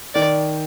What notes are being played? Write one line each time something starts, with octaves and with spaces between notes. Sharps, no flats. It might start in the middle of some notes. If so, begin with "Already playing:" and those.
D#3 D5